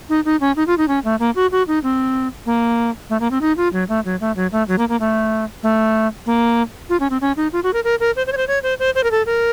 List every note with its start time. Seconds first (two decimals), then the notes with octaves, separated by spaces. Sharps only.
0.09 D#4
0.25 D#4
0.41 C#4
0.56 D#4
0.67 F4
0.78 D#4
0.88 C#4
1.04 A3
1.20 A#3
1.35 F#4
1.52 F#4
1.68 D#4
1.83 C4
2.46 A#3
3.10 A3
3.20 A#3
3.31 C4
3.41 D#4
3.57 F4
3.73 F#3
3.89 A3
4.05 F#3
4.21 A3
4.36 F#3
4.52 A3
4.68 F#3
4.78 A#3
4.89 A#3
5.00 A3
5.63 A3
6.26 A#3
6.90 F4
7.00 C#4
7.10 C4
7.21 C#4
7.37 D#4
7.53 F4
7.63 F#4
7.74 A#4
7.84 A#4
8.00 A#4
8.16 C5
8.27 C5
8.32 C#5
8.37 C5
8.48 C#5
8.63 C5
8.79 C5
8.95 C5
9.04 A#4
9.11 A4
9.26 A#4